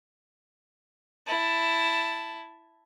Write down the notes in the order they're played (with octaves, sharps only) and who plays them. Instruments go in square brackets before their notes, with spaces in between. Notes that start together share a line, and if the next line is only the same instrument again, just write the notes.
[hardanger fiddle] E4 A5